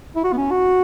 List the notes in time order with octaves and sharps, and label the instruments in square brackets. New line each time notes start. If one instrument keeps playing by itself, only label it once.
[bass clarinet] E4
F#4
B3
C#4
F#4